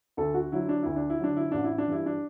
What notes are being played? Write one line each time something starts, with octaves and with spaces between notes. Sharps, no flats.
D2 A4
F#4
D3 F#3 E4
D4
D2 E4
D4
E4
D3 F#3 D4
E4
A1 D4
E4
D4
G2 E3 E4
D4